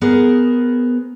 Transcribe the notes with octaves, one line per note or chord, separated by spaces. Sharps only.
B3 G#4 A#4 C5